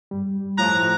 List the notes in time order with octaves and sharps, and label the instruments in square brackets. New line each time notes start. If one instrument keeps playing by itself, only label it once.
[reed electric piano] G2 G3
[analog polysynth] A2 F3 [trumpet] A#5 [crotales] F#6